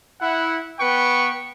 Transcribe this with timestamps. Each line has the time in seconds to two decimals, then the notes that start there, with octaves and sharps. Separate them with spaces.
0.21 E4 F#5
0.79 B3 B4 G5 C#6